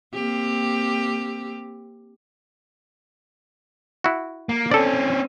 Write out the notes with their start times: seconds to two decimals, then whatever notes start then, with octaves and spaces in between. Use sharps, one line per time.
0.14 A#3 C4 G4
4.04 E4 F#4
4.49 A#3
4.71 C4 C#4 A4 D5